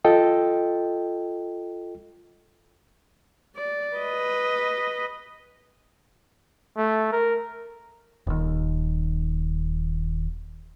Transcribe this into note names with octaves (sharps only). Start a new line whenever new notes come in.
F4 A4 D#5 G5
D5
B4 D#5
A3
A#4
D#1 D#2